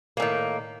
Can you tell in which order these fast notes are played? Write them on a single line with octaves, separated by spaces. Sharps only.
A#3 A2 D#3